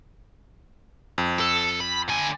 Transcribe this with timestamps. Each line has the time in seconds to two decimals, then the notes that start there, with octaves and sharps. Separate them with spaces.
1.18 F2
1.41 A4
1.81 B5
2.09 D3 G#5